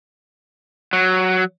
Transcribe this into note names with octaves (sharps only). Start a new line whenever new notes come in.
F#3